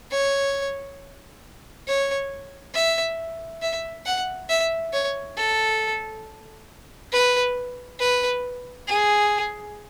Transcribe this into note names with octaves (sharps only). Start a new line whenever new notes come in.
C#5
C#5
E5
E5
F#5
E5
C#5
A4
B4
B4
G#4